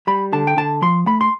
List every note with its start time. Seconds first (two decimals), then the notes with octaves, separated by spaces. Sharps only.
0.07 G3 B5
0.33 D3 A5
0.47 G5
0.57 D3 A5
0.82 F3 C6
1.07 A3 B5
1.21 C6